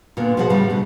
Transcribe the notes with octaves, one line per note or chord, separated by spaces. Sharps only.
A#2 D3 B3
B2 F3 G#4 C5 F#5
A2 C#3 G3
B2 D3